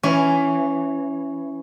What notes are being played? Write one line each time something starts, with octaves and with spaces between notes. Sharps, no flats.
E3 C#4